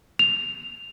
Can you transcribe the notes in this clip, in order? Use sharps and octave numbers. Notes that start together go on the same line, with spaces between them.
F7